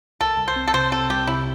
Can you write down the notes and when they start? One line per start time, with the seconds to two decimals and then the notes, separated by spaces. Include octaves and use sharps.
0.21 C2 A4
0.38 C2
0.48 C5
0.56 C4
0.68 A4
0.74 C3 C5
0.92 C4 A4
1.10 C2 G4
1.27 C3 E4